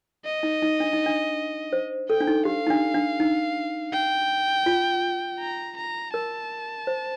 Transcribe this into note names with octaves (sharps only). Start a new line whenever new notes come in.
D#5
D#4
D#4
D4
D#4
D4
C5
A4 G5
D4
D#4
G4 F5
D#4
D4
D4
D#4
G5
F4
A#5
A#5
A#4 A5
C5